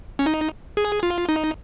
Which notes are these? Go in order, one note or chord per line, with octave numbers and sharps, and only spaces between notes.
C#4
D#4
G#4
F4
D#4